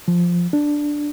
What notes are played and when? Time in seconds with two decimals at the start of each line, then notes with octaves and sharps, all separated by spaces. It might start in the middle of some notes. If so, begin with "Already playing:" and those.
0.08 F3
0.53 D4